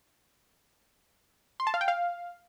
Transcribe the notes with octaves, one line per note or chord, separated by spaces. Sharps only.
C6
A5
F5
G5
F5